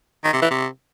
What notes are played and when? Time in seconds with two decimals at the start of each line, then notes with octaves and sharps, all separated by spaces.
0.24 D#3
0.33 C3
0.42 E3
0.51 C3